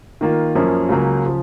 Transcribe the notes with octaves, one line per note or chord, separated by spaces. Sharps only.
D#3 A#3 F4
F#2 F3 A#3 C#4
C#2 C#3 F#3 A#3
C#3 F3